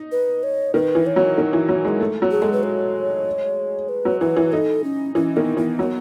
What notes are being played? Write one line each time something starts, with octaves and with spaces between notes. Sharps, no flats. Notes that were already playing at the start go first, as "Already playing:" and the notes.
Already playing: D#4
B4
C#5
D#3 B4
E3
C#5
F#3
D#3
E3
F#3
G#3
A3
F#3
G#4
G#3 A4
B4
C#5
B4
F#3
E3 B4
E3
D#4 A4
C#4
E3 C#4
D#3 B3
E3 B3
F#3